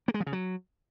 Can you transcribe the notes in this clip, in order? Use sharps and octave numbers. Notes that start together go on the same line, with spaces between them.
A#3
G#3
F3
C#3
F#3